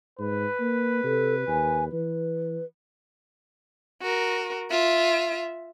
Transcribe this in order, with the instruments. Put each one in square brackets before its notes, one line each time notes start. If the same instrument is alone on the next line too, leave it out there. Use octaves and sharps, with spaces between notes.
[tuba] G#2 [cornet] B4
[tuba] A#3
[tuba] C3 [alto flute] A4
[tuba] D#2 [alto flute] G#5
[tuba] E3 [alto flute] B4
[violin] F#4 A#4
F4 E5